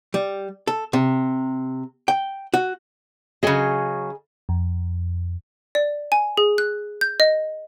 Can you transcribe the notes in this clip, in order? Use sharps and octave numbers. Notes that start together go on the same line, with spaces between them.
G3
A4
C3
G5
F#4
C#3 F#3 G#4 D#5 G#5
F2
D5
G#5
G#4
F#6
G6
D#5